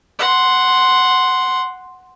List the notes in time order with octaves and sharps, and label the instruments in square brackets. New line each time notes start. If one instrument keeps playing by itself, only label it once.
[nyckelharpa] F#5 C6